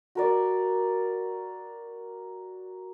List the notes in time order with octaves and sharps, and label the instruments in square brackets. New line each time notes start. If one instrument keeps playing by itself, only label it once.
[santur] F#4 A#4 D5